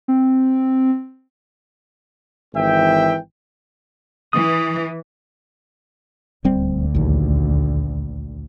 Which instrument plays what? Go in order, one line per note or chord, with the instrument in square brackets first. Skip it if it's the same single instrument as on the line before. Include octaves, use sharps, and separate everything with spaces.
[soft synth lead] C4
[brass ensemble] G#1 E3 E5 G5
[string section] E3 [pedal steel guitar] D#6
[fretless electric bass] D#1 G3 C4 [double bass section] D2
[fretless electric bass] A#1 D#2